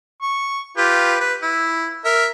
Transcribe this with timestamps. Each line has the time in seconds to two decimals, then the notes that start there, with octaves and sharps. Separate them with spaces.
0.22 C#6
0.77 F4 G4 B4
1.20 B4
1.42 E4
2.05 A#4 E5